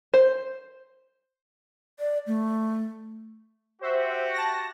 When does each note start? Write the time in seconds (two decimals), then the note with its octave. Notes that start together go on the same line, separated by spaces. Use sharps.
0.14 C5
2.00 D5
2.27 A3
3.81 F#4 G4 C5 E5
4.33 A5 A#6